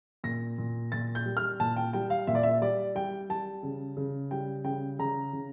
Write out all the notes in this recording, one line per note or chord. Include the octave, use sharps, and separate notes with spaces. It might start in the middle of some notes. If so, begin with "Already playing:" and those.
A#2 A#6
A#2
A#2 A6
G6
G3
F6
A#2 A5
G5
G3 G5
F5
A#2 E5
D5
E5
G3 D5
G3 G5
G3 A5
C#3
C#3
G3 G5
C#3 G5
C#3 A#5
C#3